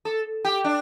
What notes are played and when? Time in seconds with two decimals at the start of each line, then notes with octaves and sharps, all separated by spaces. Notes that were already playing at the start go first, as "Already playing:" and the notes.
0.05 A4
0.45 G4
0.64 D4